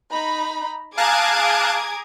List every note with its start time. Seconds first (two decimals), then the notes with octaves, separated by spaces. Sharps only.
0.11 D#4 A#5 B5
0.97 G#4 F5 A5 A#5 D6 D#6 F#6 G#6